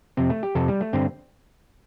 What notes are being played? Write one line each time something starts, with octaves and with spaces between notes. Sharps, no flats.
F2 C3 C4
A3
G4
F2 C3 A4
G3
A3
G2 D3 C4